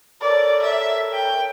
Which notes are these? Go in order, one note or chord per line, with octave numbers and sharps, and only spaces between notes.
A4 A#4 C#5 D5
E5
G5